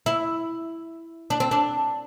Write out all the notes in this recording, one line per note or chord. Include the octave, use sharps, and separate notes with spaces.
E4
D4
C4
D4